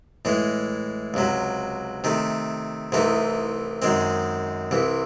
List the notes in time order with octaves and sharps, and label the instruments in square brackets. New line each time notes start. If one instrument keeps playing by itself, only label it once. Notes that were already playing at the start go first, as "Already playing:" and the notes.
[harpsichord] A2 E3 G#3
C#2 C3 F#3
C3 D#3 A3
C2 C3 E3 A3 D#4
F#2 D#3 G#3 C4
C2 C3 E3